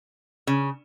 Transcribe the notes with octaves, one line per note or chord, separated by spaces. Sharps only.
C#3